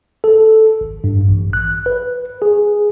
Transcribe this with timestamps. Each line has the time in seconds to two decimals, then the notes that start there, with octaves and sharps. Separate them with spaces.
0.24 A4
0.81 G#1
1.04 G2
1.28 A1
1.53 F#6
1.86 B4
2.42 G#4